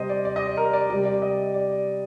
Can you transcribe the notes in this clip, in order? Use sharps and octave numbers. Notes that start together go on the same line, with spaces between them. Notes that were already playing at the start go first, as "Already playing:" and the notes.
Already playing: C3 G3 C5 D#5
D5
D5
D#5
D5
A#4
D5
C3 G3 D5
D5
D#5
D5